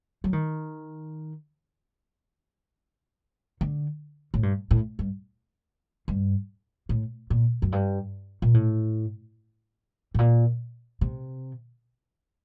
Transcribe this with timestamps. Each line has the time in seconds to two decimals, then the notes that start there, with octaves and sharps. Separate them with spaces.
0.24 F#3
0.33 D#3
3.61 D3
4.34 A2
4.43 G2
4.71 A2
4.99 G2
6.08 G2
6.89 A2
7.30 A#2
7.62 F#2
7.72 G2
8.42 A#2
8.54 A2
10.15 A2
10.19 A#2
11.01 C3